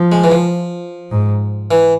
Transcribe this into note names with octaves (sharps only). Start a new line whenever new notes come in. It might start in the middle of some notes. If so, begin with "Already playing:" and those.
Already playing: F3
G#3
E3
F3
G#2
E3